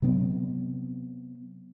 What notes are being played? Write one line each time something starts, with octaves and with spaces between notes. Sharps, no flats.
C3 F#3 B3 C4